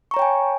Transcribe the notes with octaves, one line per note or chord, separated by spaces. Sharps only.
C#5 G5 G#5 A#5 C#6